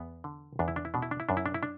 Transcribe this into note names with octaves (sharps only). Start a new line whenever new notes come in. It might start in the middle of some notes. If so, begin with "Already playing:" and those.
Already playing: E2 B3
D3
E2 D4
E4
D4
E4
B2 D4
E4
D4
E4
F#2 D4
E4
D4
E4
D4